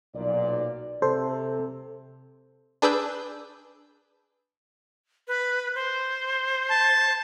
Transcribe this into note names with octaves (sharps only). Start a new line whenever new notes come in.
B1 A#2 D5
C3 A4 C5
D4 G#4 B4 D6 E6 G6
B4
C5
A5